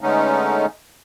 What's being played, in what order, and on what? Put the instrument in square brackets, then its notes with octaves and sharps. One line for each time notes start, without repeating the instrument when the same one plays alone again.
[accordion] D3 G#3 A3 B3 C#4 D#4